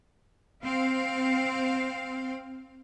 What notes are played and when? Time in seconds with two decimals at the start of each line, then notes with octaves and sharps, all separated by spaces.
0.62 C4 F5